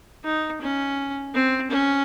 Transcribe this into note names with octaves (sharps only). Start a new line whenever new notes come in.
D#4
C#4
C4
C#4